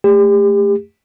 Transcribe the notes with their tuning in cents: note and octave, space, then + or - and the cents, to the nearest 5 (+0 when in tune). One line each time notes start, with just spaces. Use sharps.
A3 +0 G4 +35